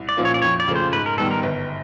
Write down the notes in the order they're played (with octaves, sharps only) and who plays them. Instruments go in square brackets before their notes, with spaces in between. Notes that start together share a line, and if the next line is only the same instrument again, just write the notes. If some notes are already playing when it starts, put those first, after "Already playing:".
Already playing: [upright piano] C2
[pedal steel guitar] D5
[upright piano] A#2 F3 A#3 C#4
[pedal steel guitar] C#5
D5
[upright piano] F2 [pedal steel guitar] C#5
[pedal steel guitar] D5
[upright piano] C#3 F3 A3
[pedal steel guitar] C5
[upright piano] G#2 [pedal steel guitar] B4
[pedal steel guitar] A#4
[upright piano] D#3 G3 B3 [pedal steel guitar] A4
[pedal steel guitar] A#4
[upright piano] G1